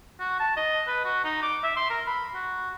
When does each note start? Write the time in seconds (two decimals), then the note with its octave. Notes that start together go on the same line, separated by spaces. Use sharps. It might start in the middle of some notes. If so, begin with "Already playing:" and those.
0.20 F#4
0.39 A5
0.57 D#5
0.87 B4
1.05 F#4
1.24 D#4
1.42 D6
1.63 E5
1.76 C6
1.90 A#4
2.06 B5
2.34 F#4